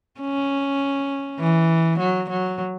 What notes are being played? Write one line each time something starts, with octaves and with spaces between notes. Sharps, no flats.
C#4
E3
F#3
F#3